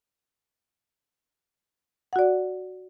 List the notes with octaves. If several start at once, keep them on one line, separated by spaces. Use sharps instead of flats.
F#4 D5 F#5